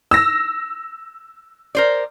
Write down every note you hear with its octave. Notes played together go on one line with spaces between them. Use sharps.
E6 A#6
A#4 C5 D5